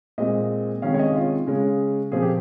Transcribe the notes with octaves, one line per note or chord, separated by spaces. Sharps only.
A#2 G#3 C4 D#5
C3 D#3 G#3 C#4 F5
C#5
D#5
F4
C#3 G#3 C#4
A#2 F3 C4 G#4
G4